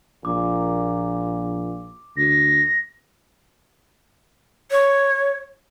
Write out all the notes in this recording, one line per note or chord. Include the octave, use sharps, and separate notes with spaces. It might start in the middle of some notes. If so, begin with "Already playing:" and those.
A#1 A#2 D6
D2 A#6
C#5